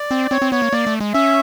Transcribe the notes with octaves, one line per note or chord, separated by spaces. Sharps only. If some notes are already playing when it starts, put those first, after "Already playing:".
Already playing: D5
C4
C4 C#5
C4
B3 C#5
A#3
A#3 D5
A3
G#3
C#4 E5